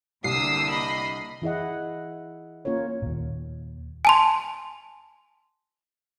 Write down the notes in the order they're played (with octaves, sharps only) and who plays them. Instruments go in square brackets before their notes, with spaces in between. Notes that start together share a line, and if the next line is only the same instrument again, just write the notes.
[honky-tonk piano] C2 [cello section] D3 A#3 G4 [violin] D#6 E6 [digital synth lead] C7
[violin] D#5 B5
[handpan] E3 E4 G#4 D#5 F#5
A#3 C#4 F4 A#4 C#5
[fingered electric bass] D#2 A#2
[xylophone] G#5 A5 C6